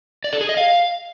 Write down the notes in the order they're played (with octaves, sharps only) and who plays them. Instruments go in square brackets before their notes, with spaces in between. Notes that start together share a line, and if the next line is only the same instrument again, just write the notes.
[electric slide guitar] D5
A4
G#4
D#5
F5